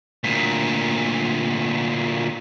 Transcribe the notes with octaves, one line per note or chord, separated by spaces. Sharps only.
D2 A#2